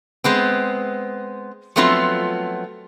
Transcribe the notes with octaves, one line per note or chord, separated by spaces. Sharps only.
G#3 B3 C4
F3 F#3 A3 B3 C4 F4